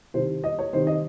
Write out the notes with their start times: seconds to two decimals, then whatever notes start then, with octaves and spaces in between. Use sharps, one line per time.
0.14 C2 C3 D#3 C5
0.44 D#5
0.59 C#5
0.72 C2 C3 D#3 C5
0.87 D#5